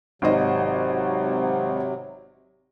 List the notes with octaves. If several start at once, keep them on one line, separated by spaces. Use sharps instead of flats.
G#1 C3 F#3 C5 D#5